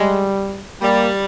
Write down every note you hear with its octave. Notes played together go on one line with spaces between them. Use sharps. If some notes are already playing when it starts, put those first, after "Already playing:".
Already playing: G3 G#3
G3 A#3